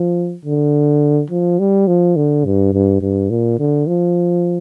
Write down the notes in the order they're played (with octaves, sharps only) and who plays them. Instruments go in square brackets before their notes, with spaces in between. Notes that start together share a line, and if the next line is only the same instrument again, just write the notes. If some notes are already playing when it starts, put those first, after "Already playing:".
Already playing: [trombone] F3
D3
F3
G3
F3
D3
G2
G2
G2
A#2
D3
F3